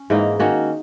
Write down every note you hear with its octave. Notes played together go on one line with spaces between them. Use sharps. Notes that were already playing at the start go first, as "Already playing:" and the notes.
Already playing: C#4
G#2 E3 A#3 D#4
D#3 A#3 C#4 F#4